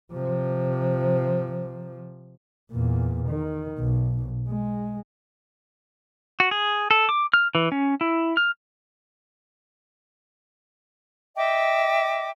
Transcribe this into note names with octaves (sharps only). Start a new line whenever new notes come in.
C3 F3
E2 A#2
D#3
B1
G#3
F#4
G#4
A4
D6
F6
E3
C#4
E4
F6
D#5 E5 G5 D6